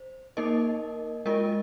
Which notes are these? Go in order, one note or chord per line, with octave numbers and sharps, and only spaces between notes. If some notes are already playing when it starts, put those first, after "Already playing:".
Already playing: C5
A#3 D#4 A#4 D#5
G#3 F4 A#4 D#5